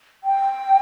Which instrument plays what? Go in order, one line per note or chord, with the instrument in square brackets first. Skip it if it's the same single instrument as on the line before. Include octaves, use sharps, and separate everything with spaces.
[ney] G5